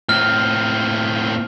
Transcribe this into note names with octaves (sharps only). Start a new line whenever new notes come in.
A2 C4 F6